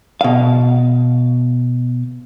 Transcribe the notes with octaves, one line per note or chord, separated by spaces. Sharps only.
B2 F5